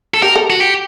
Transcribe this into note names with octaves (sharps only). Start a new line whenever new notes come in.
A4
G4 A#4
A4
F#4
G4